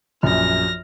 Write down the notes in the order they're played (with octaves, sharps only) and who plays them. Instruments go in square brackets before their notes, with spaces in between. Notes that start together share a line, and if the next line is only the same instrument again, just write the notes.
[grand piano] A#1 F#2 [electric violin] F6 A#6